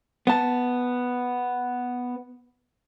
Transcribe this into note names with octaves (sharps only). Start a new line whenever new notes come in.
B3 A5